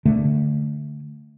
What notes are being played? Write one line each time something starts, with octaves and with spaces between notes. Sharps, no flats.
D3 A3